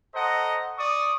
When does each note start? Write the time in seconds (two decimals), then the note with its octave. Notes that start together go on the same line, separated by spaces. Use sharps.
0.14 A4 C5 D#5 F#5 A#5
0.78 D5 C#6 D#6